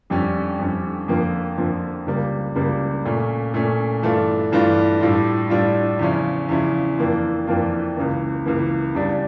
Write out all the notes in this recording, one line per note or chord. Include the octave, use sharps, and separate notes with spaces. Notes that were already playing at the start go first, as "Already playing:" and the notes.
F2 D3 G3 C#4
F2 D3 G3 C#4
F2 D3 F3 A#3
F2 D3 F3 A#3
C#2 C#3 G3 A#3
C#2 C#3 G3 A#3
A#2 A3 C#4
A#2 A3 C#4
G2 E3 A3 D4 F4
G2 E3 A3 D4 F4
A2 G3 D4 F4
A2 G3 D4 F4
E2 C#3 F3 C#4 E4
E2 C#3 F3 C#4 E4
F2 E3 A#3 D4 F4
F2 E3 A#3 D4 F4
C#2 C#3 E3 A#3
C#2 C#3 E3 A#3
E2 C#3 G3 D4